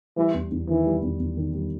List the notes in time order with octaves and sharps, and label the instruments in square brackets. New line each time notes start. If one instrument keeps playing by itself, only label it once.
[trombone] E3 [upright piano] G3
[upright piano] E2
E2
[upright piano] D#3 [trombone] E3
[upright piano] G3
E2
E2
D#3
G3